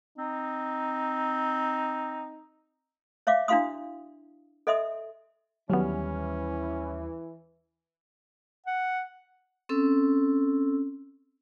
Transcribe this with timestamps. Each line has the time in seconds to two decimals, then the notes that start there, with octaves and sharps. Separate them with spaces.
0.18 C4 D#4
3.27 C#5 E5 F5 D6
3.48 D4 E4 F#4 F5 C6 D#6
4.67 A4 D#5 E5 C6 D#6
5.70 D#2 E3 F#3 G3 B3 C#4 F6
8.66 F#5
9.69 C4 C#4 A4 E6